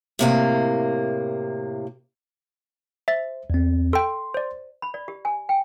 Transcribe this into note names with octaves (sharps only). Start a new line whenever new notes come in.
A2 C3 A#3
C5 E5 A6
E2 C4
A4 G5 C6
C5 D5
B5
D5
G4
G#5
G5